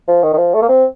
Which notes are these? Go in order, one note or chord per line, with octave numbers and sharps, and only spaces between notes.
F3
D#3
D#3
F3
A3
A#3
C4